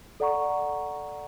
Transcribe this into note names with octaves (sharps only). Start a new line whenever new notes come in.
A4 D5 F#5 A#5 C#6